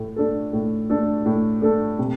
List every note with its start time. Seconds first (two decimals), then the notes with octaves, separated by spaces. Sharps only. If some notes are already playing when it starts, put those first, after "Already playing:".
Already playing: A2 A3
0.16 A3 D4 A4
0.53 A2
0.89 A3 D4 A4
1.26 A2
1.61 A3 D4 A4
1.99 C3